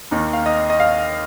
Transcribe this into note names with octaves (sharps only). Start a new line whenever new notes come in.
D#2 D#3 A#3 D#4
F5
D#5
D#5
F5